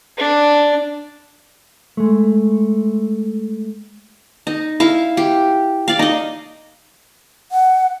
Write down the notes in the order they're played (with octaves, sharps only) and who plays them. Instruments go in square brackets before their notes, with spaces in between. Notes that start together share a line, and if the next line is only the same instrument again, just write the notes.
[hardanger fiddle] D4
[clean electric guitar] G#3 A3
[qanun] D#4
E4 F5
G4
D5 F5
D#4 D#5
[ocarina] F#5